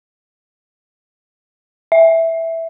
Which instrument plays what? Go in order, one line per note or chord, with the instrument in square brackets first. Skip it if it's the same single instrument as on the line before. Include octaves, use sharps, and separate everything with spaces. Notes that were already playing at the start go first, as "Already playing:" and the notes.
[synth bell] E5